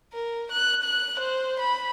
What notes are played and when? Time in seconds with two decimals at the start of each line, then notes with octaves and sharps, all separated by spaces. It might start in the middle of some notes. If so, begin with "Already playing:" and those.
0.13 A#4
0.52 F#6
0.83 F#6
1.20 C5
1.60 B5